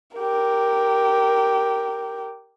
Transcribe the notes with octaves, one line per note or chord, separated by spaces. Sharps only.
G4 A#4